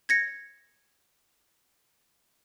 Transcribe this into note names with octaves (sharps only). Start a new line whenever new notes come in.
G#6 A#6 C#7